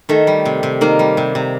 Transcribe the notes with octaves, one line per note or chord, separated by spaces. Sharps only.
D#3 A3
G3
C3
C3
D#3 A#3
G3
C3
C3